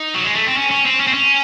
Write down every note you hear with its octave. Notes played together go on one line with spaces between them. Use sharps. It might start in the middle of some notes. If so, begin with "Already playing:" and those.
Already playing: D#4
F#3
G#3
A3
C4
C#4
C#4
C4
C#4
C4
C#4